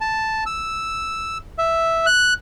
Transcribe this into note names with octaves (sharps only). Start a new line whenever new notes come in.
A5
E6
E5
F#6